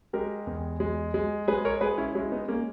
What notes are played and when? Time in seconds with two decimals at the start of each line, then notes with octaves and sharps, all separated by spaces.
0.13 G#3 G4 A#4
0.47 E2
0.80 G#3
1.14 G#3
1.48 G#3 G#4 B4
1.65 A#4 C#5
1.81 G#3 G#4 B4
1.98 C#4 E4
2.15 G#3 C#4 E4
2.31 B3 D#4
2.48 G#3 A#3 C#4